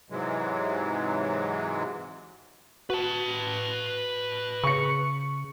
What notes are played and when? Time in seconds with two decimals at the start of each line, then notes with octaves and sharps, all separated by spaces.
0.10 G#2 C3 E3 F#3 G#3
2.90 F#4 B4 A5
4.64 C#3 C#6 C#7